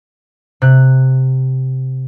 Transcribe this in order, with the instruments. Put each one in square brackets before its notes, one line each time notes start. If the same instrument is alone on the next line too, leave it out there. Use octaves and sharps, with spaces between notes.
[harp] C3 F#6